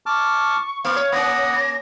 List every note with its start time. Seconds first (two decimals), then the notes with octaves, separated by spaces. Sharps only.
0.06 A5 C#6 D6 F6
0.85 A#3 F5
0.96 C#5
1.12 A#3 C#4 F#5 B5 D#6 A#6